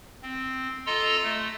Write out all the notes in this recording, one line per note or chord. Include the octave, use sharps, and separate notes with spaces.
C4
F4 A4 D#5 A#5 C6 E6
A3